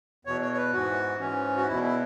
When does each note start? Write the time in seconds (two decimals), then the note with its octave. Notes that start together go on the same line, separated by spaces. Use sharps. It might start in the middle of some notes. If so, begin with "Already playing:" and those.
0.25 E2 B2 C#5
0.41 C#5
0.53 C#5
0.57 B4
0.73 G#2 E3 F#4
1.20 G#2 E3 C#4
1.57 F#4
1.67 E2 B2 E4
1.83 E4